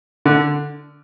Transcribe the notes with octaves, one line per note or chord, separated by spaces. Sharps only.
D3